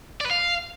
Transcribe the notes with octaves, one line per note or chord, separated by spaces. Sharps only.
D5
B4
F5